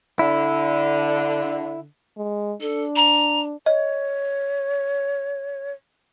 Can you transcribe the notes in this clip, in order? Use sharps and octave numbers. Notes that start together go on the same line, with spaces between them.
D3 E4
G#3
D4 A4
A#5
C#5 D#5